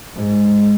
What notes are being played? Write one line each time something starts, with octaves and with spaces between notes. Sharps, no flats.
G#2